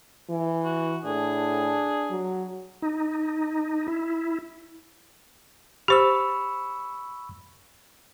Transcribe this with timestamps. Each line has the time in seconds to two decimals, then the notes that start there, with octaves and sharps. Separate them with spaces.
0.29 E3
0.65 F#4
1.05 A2 D4 G#4
2.10 F#3
2.82 D#4
3.88 E4
5.88 G4 C5 B5 C#6 E6